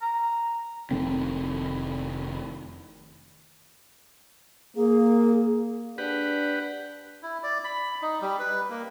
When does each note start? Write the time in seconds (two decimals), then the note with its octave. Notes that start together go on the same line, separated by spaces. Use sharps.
0.02 A#5
0.91 F1 D#3 A3 C4
4.76 A#3 G#4
5.98 D4 G4 B4 F#5
7.23 E4
7.43 D5
7.64 B5
8.02 D#4
8.22 G3
8.39 B4
8.70 A#3